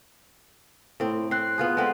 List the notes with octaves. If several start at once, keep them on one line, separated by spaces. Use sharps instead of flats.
A2 C4
C4 F#6 C7
B3 F4 G#4
G#3 C4 A4 B4 F#5